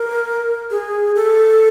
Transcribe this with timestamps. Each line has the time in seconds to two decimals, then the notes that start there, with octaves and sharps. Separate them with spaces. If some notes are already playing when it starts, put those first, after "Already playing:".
Already playing: A#4
0.71 G#4
1.16 A4